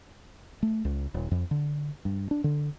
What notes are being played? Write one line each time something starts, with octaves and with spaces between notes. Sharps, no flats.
A3
C#2
D#1
F2
D3
G2
D4
D3